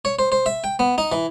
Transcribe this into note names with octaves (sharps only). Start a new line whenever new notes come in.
C#5
C5
C5
E5
G5
B3
D#4
E3